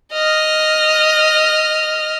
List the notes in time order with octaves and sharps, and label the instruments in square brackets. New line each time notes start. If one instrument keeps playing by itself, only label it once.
[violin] D#5 F6